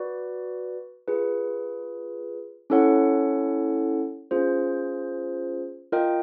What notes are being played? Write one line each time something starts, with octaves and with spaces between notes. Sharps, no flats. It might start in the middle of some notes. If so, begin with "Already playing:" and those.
Already playing: F#4 B4 D5
F4 G#4 B4
C#4 E4 A4 C#5 F#5
C#4 F4 G#4 C5
F4 A#4 D#5 G5